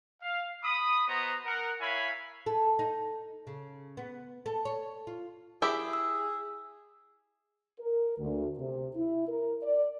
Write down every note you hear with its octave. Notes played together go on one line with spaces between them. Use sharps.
F5
B5 D#6
B3 F#4 C5 D#5 A#5
A#4 F#5
E4 C#5 F5 G#5 B5
A4
D#4
C#3
B3
A4
C#5
F4
E4 G4 G#4 E5
E6
A#4
D2
C3
E4
A#4
D5